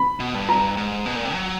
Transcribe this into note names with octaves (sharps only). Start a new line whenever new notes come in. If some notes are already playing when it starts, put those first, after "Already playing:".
Already playing: B5
B2
G2
A#5
G#2
B2
A#2
C3
F#3